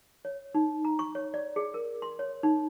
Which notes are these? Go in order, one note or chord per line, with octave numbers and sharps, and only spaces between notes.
C#5
D#4
A#5
C#6
C#5
D5
G#4
A#4
C6
C#5
D#4